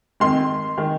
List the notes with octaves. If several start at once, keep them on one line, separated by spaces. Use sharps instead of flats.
F2 D#3 G#3 C6
D#3 G#3